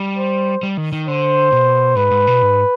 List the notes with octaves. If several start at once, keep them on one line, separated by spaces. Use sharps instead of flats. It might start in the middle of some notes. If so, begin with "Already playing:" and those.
Already playing: G3
C5
G3
D#3
D#3
D3 C5
B2
G#2 B4
G#2
B2
G#2